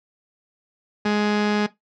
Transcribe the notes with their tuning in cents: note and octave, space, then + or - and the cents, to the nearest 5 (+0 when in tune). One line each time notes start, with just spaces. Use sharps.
G#3 +10